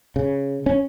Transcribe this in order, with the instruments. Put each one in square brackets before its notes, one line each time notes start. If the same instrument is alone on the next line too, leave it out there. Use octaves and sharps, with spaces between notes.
[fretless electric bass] C#3
C#4